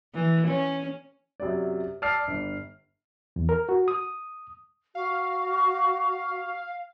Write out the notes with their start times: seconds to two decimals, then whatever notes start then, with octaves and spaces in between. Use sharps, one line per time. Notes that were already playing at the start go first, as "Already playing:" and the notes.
0.14 E3
0.47 C#4
1.40 F#2 C3 D5
2.02 D5 A5 D6 E6 F6 C7
2.28 G1
3.36 E2
3.49 A#4
3.69 F#4
3.88 D#6
4.95 F#4 F5